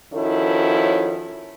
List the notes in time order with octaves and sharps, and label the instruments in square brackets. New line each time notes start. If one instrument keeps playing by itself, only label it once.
[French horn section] D#3 F3 C#4 E4 F#4 A4